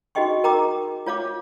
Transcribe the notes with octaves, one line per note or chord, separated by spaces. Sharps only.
D#4 F#4 G#4 D#5 G5 C#6
A#4 G5 A#5 D6 D#6
F4 C#5 F5 D6